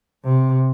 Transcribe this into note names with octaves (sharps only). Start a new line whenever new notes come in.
C3